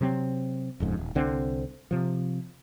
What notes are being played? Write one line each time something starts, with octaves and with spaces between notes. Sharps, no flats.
C3 F#3 C4
D#1 F2 G#2 C#3
D#1
C2 D3 C4
C3 F3